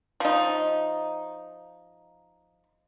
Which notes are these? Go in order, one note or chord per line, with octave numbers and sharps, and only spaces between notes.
F3 D#4